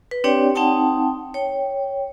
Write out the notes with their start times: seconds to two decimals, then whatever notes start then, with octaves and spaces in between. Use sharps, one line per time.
0.11 B4
0.24 C4 D4 G4 C#5 D5 G5
0.55 C4 D#4 F#5 G5 A5 D#6
1.34 C#5 G5